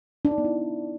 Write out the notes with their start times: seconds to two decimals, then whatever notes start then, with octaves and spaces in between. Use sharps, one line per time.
0.25 D4
0.31 D#4
0.38 B3
0.45 E4